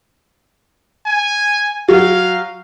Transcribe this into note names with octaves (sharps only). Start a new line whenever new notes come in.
G#5
F#3 F5